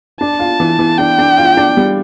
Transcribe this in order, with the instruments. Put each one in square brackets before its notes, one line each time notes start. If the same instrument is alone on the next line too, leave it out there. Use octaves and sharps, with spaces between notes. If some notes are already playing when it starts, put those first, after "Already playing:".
[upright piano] D4 [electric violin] A5
[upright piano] F4
E3
E3
[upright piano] D4 [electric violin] G5
[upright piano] D4
F4
D4
G3